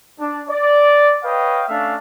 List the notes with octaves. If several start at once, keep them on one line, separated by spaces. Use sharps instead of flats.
D4
D5
B4 C#5 D#5 F5 G5
A3 C#4 D4 E5 F5